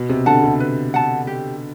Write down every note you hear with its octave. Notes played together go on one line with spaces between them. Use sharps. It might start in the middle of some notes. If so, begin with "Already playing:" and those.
Already playing: B2
C3
D3 F#5 A5
C3
B4
F#5 A5
G4